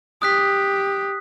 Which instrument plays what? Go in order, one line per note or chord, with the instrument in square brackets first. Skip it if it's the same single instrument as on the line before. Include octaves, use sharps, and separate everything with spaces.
[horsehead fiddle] G4 [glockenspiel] D#6 F#6 B6